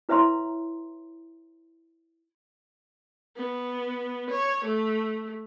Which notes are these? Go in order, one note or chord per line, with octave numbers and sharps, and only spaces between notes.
E4 B4 C#5 E5 A#5 C6
B3
C#5
A3